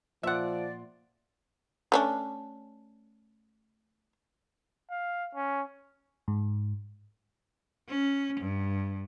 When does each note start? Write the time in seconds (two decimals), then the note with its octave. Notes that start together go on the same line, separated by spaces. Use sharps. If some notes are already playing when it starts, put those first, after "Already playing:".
0.23 A#2 F3 D5 E5 F#5 C6
1.92 A3 C#4 D4
4.91 F5
5.35 C#4
6.28 G#2
7.89 C#4
8.40 G2